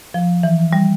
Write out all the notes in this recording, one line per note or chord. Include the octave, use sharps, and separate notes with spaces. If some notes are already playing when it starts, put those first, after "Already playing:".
F3
E3
G3